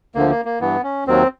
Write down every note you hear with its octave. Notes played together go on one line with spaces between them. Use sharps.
D2 D3 F3 A#3
A#3
A#3
G2 E3 B3
C#4
D#2 D#3 F#3 C4